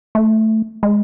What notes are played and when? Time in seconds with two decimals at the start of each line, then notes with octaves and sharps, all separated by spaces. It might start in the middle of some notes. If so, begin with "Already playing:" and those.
0.15 A3
0.83 G#3